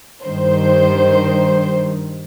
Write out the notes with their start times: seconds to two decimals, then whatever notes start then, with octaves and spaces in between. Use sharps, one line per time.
0.25 G2 D#3 C5